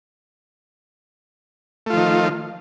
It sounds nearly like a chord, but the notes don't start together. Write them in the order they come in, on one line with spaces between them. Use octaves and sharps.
A3 F4 F3 D#3